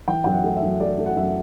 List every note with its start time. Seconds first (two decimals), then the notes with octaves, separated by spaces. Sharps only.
0.08 E3 G5
0.24 F#2 G5
0.32 F#5
0.44 A3
0.56 E5
0.62 F#2
0.80 A3 D5
0.98 A3
1.06 F#5
1.17 F#2 E5